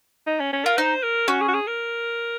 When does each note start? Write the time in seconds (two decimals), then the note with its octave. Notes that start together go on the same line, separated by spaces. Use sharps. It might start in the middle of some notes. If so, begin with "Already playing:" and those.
0.27 D#4
0.39 C#4
0.53 C#4
0.65 F4 A#4
0.78 D#4 C5
1.03 A#4
1.28 C#4 F#4
1.41 G#4
1.48 F#4
1.54 G#4
1.67 A#4